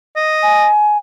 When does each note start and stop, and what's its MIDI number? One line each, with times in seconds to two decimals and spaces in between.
0.16 0.68 75
0.43 0.98 80